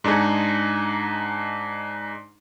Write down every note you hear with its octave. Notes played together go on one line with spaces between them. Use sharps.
G#2 D4 D#4 G#4